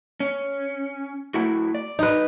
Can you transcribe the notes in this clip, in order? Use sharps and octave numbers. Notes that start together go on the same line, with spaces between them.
C#4
A3 E4 F#4
D5
D#4 B4